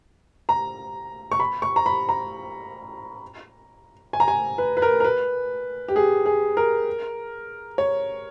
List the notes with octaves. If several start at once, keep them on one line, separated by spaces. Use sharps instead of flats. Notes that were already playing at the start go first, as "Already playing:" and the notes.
A#5
C#6
B5
C#6
A#5
B5
A#5
G#5
A#5
G#5
B4
B4
A#4
A#4
B4
G4
G#4
G#4
A#4
C#5